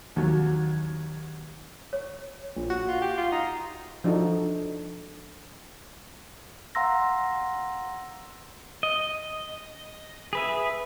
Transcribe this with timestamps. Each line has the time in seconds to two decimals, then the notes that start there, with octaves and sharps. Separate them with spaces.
0.16 D#2 F#3
1.93 C#5
2.57 A#1
2.70 F#4
2.88 F4
3.02 G4
3.17 F4
3.32 D#4
4.04 F3 D4 D#4 F#4 A4
6.75 F5 F#5 A#5 C6 E6 A#6
8.83 D#5
10.33 G#4 B4 E5